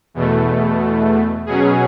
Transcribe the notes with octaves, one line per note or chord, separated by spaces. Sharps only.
E2 B2 A3
B2 F#3 C#4 G#4